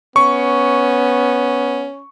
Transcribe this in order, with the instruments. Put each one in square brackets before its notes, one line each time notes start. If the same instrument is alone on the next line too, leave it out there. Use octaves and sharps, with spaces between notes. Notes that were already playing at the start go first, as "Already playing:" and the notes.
[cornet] B3 [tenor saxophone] C#4 [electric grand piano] C#6